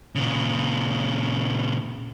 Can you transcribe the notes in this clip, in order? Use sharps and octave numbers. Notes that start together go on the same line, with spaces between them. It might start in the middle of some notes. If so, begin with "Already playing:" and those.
A#2 C#3